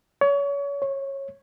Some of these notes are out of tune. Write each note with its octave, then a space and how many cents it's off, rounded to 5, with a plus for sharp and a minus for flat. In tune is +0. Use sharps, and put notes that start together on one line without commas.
C#5 +30
C#5 -20